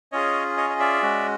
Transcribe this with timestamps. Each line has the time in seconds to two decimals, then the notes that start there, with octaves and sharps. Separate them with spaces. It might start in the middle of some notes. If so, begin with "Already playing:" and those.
0.12 C#4 F4 G#4 C#5 D#5
0.57 C#5 D#5
0.70 D#5
0.80 D5 E5
1.02 G#3 C#4 F#4